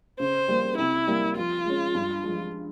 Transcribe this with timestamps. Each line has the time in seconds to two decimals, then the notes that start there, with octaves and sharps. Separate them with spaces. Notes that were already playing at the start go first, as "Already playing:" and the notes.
0.19 C#3 C5
0.48 G3 A#3
0.77 C3 E4
1.07 G3 A#3
1.36 F3 F4
1.65 G#3 C#4
1.95 G2
2.23 F3 G#3